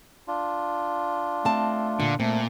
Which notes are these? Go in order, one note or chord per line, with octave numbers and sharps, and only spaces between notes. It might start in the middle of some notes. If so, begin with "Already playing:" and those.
D4 F4
A3 C4 A5
A#2 D3
A#2 A3 C4